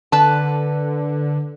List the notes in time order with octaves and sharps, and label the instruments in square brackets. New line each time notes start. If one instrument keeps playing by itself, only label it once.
[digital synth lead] D3 [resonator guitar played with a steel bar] B4 A5